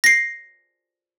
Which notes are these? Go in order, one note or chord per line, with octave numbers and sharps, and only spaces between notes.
A#6 C7